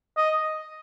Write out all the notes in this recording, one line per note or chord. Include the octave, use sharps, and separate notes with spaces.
D#5